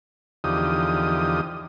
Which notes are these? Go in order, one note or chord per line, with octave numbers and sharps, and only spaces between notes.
E2 D3 F3 D#4 G4 D#6